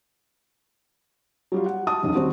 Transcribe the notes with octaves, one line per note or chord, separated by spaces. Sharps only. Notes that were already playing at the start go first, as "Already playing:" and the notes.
F#3 G3 F4
F#5
A5 D#6
E1 B1 F#2
D#3 G3 C4 F#4 C5